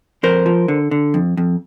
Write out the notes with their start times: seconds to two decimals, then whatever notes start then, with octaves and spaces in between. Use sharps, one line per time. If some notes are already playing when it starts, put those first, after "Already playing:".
0.23 F2 A#4 C5
0.46 F3
0.68 D3
0.91 D3
1.14 F2
1.37 F2